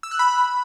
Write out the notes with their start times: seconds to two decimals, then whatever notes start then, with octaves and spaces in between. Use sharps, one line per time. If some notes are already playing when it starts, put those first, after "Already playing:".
0.03 E6
0.11 F#6
0.19 B5